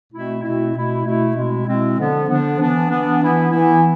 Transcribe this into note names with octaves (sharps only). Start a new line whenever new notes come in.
B2 A3 C4 E4
B2 A3 C4 E4
B2 A3 E4
B2 A3 E4
B2 G#3 C4 E4
B2 G#3 C4 E4
D3 F3 B3 D4
D3 F3 B3 D4
E3 B3 D4
E3 B3 D4
E3 B3 E4
E3 B3 E4